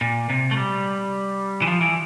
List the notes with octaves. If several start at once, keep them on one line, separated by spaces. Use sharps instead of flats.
A#2
C3
A3
G3
E3
F3
E3